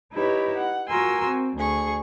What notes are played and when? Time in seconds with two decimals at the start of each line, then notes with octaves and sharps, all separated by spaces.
0.13 D#4 E4 G4 B4 C#5
0.56 F#5
0.88 F4 F#4 A#4 G#5 C6 E6
1.26 C4
1.57 D2 G#4 C#6